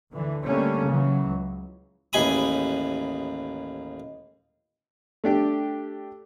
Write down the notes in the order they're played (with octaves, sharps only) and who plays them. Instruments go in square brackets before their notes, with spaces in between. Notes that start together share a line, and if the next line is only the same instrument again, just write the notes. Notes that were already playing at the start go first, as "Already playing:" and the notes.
[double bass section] D2 D3 E3
D3 G3 A3 A#3 C#4
C#3 E3 F#3
C#2
[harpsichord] A1 D#2 G#4 G#5 B5 D#6
[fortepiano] A3 D4 G4